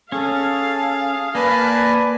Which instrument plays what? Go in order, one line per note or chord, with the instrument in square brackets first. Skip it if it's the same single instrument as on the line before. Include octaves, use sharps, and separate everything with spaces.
[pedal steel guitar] C#4 [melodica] G#4 [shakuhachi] A4 [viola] F5
[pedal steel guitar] A#3 [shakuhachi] B4 [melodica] D5 G#5 A5